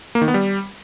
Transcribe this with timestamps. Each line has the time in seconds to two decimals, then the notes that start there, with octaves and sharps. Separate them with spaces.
0.15 A#3
0.21 D#3
0.28 B3
0.34 G3